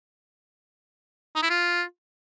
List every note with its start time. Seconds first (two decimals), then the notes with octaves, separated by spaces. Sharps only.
1.35 D#4
1.43 E4
1.50 F4